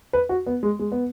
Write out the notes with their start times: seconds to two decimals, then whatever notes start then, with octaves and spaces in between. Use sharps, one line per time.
0.13 B4
0.29 F#4
0.47 B3
0.63 G#3
0.79 G#3
0.92 B3